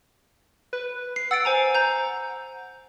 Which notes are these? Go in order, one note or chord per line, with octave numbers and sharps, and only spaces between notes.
B4
C7
F#5 E6 A6 D7
C5 G#5 A#5
A#5 G6